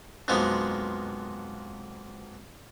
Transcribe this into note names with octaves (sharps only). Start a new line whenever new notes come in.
B1 F2 F3 G#3 A#3 B3